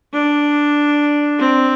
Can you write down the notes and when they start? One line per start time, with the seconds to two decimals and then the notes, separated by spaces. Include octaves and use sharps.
0.13 D4
1.40 C4